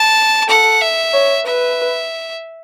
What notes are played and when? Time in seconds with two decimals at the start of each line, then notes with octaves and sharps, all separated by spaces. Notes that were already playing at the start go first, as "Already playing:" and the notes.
Already playing: A5
0.48 A4 F#5
0.81 E5
1.13 C#5
1.46 B4 E5